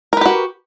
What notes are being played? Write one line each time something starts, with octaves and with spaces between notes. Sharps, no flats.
F#4 G4 A#4 B4